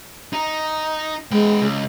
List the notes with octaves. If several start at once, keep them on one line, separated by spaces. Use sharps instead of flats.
D#4
G#3 B3 G5
C#2